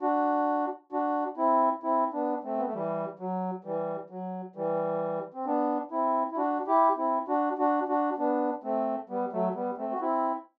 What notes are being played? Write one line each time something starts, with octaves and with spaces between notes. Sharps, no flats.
D4 F#4
D4 F#4
C4 E4
C4 E4
B3 D4
A3 C4
B3
A3
E3 G3
F#3
E3 G3
F#3
E3 G3
C4
B3 D4
C4 E4
E4
D4 F#4
E4 G4
C4 E4
D4 F#4
D4 F#4
D4 F#4
B3 D4
A3 C4
G3 B3
F#3 A3
G3 B3
A3 C4
F#4
C4 E4